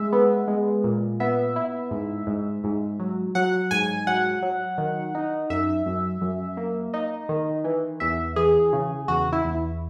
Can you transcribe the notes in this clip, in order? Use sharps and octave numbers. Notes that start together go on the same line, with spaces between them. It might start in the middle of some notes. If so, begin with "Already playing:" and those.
Already playing: G#3 E5
B3
G#3
A#2
B3 E5
E4
G#2
G#2
G#2
F#3
F#3 F#5
G#2 G#5
F#3 F#5
F#3
D#3
D#4
F#2 E5
F#2
F#2
A#3
D#4 D#5
D#3
E3
E2 E5
E3 G#4
C#3
E2 F#4
E4
E2